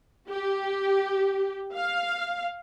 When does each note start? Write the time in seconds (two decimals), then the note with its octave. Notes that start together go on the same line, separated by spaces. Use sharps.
0.30 G4
1.75 F5